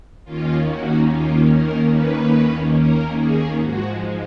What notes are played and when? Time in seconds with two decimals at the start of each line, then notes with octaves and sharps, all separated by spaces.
0.25 D#2 D#3 A#3 C#4 F4
0.67 F#4
1.08 F4
1.50 A#4
1.92 B4
2.76 A#4
3.18 G#4
3.59 G#2 F3 G#3 F#4